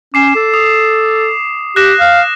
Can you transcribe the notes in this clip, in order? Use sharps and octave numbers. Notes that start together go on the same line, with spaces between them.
C#4 D6 C7 E7
A4
D#6
G4 F#6 A#6 E7
F5